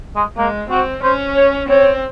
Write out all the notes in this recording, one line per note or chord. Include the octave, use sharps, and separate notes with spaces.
G#3
G#3 A#3
C4 F#4
C#4 C5
C#5
C4 C#5